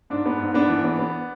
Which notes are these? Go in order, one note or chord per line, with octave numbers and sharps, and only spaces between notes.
G#2 D4
B3
G#2
B3 D4
E3
B3
B3